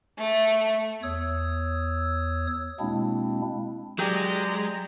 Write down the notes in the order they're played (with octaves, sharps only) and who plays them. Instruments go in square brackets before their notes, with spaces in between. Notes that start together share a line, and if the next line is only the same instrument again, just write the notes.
[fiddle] A3
[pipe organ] E2 C#5 D#6 E6
B2 G#3 A#3 C4 D4 E4
[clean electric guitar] F#3 [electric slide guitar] G#3 [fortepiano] G4 [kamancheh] D5 A#5